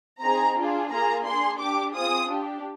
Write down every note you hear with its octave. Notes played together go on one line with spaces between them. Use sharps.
C4 D#4 G#4 A#5
D4 F4 G#4
A#3 F4 G#4 A#5
D4 G#4 C6
D4 G4 D6
C4 F4 G#4 D#6
D4 G4